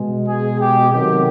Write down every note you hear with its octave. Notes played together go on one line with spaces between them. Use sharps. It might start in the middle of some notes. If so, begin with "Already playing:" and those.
Already playing: B2 G#3
G#4
G4
C3 D#3 F#3 A3 G4